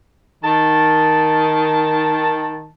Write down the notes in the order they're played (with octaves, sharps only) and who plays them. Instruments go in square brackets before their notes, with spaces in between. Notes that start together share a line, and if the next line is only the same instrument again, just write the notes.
[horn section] D#3 A5